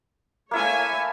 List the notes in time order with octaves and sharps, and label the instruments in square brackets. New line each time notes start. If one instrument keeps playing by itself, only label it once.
[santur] A#3 E4 A4 [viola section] C#5 E5 G#5